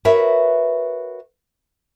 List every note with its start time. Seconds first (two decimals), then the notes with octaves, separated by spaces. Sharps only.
0.05 F#4 A#4 B4 C#5 E5